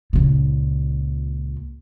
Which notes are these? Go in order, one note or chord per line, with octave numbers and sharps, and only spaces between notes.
C#2 A#2